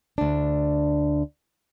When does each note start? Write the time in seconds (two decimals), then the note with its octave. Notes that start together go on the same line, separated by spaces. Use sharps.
0.18 D2 D4